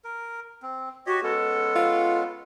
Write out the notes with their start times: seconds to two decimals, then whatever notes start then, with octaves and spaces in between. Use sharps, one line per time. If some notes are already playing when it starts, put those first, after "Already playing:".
0.04 A#4
0.62 C4
1.06 F#4 G4 C#5 D#5
1.23 G#3 B3 C#4 A4
1.75 F4